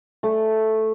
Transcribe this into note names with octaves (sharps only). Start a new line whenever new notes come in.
A3